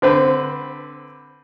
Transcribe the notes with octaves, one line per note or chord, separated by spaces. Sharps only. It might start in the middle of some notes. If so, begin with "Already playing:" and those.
D3 C4 B4